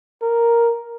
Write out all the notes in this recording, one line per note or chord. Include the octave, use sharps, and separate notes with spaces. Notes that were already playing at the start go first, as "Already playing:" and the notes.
A#4